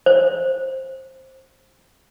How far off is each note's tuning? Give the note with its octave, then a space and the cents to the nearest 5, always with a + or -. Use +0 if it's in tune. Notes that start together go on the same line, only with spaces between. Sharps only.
C5 +15